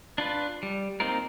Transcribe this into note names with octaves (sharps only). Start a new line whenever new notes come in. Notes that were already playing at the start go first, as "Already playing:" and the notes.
D4 F4 B4
G3
A#3 C4 D#4 F4 A#4